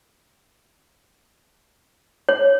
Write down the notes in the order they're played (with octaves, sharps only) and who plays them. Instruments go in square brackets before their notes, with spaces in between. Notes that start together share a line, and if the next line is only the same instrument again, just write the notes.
[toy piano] C#5